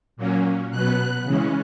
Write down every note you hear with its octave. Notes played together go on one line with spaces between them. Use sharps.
A#2 F#3 A#3 C#4
B2 F#3 B3 F#6
C#3 E3 G#3 C#4